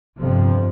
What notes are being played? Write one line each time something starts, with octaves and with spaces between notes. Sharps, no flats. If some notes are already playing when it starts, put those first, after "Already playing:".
G1 F2 C3 F3